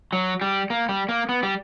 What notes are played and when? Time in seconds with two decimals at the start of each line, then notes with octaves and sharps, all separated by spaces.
0.13 F#3
0.41 G3
0.70 A#3
0.89 G3
1.09 A#3
1.29 B3
1.43 G3